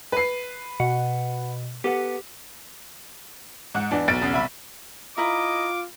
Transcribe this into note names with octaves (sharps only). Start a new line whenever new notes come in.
B4 C7
B2 F#5
B3 G4 A4 F#5
G#2 F#5
E2 E3 D4
B1 A6 D7
E2 C#3
C2 E5 B5
E4 F4 A#4 D#5 D6